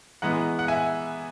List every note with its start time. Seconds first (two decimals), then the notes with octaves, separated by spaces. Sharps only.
0.22 E3 G#3 B3 F#5 A#5
0.59 F#5
0.68 E5 G#5